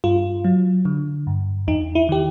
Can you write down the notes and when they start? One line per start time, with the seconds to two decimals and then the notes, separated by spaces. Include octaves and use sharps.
0.04 G2 F4
0.45 F#3
0.85 D3
1.27 G2
1.68 E2 D#4
1.95 E4
2.09 D#3 G4